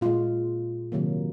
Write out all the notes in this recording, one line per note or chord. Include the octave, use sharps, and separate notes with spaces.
A#2 G#3 F4
C3 D#3 F#3 A#3